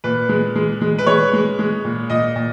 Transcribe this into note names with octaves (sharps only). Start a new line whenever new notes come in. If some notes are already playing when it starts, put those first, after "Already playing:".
A#2 B4
G#3
G#3
G#3
B4
G#3 C#5
G#3
G#3
A#2
A#2 D#5
A#2